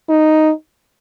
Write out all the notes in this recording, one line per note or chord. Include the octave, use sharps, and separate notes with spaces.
D#4